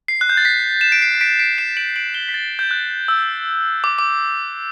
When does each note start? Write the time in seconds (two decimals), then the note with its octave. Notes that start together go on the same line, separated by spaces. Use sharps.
0.08 C7
0.21 F#6
0.29 G6
0.37 A6
0.45 B6
0.81 E7
0.92 D7
1.02 C7
1.21 B6 D7
1.39 B6 D7
1.58 C7 E7
1.77 D7 F#7
1.96 D7 F#7
2.14 E7 G7
2.29 B6
2.34 A6
2.59 G6
2.71 F#6
3.08 E6
3.84 D6
3.99 D6